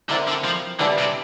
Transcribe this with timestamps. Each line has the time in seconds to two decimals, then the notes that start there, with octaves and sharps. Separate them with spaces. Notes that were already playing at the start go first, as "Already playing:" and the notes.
0.09 D3 C4 E4 A#4
0.28 D3
0.44 F3
0.79 D3 E3 G3 D4
0.98 C3